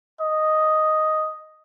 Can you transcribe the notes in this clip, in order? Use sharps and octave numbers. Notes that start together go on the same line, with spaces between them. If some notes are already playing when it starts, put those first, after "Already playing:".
D#5